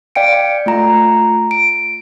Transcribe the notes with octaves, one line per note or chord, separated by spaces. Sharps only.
D5 F5 G5 C#7 D7
A3 F4 A#5
D7